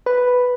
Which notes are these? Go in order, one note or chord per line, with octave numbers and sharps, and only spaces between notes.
B4